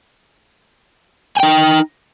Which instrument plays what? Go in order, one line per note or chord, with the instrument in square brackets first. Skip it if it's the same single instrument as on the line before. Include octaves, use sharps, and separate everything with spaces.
[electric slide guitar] G#5
G5
D#4